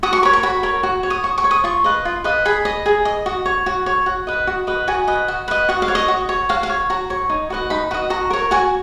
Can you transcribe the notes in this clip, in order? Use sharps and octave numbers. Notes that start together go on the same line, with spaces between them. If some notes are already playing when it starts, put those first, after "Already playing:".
F#4 D#6
C#6
A#4 C#5 B5
C#6
F#4 B5
A#4 C#5
F#4
C#5
D#6
F#4 C#6
C#6
C#5
D#6
F4 C#6
B4 D#5
F4
B4 D#5
G#4 B5
D#5
G#4
D#5
F#4
C#5
F#4
C#5
F#4
B4 D#5
F#4
B4 D#5
F#4 G#5
B4 D#5
F#4
B4 D#5
F#4 F#5
F5
C#5
D#5
F#4
C#5
F#4 F5
F5
C#5
F#4 A#5
C#5
D#4
F#4 B4 D#5
D#4 B5
F#4 B4 D#5
F#4 A#5
A#4 C#5
F#4 G#5